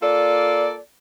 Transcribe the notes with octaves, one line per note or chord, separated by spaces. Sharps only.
A#3 F4 A4 D5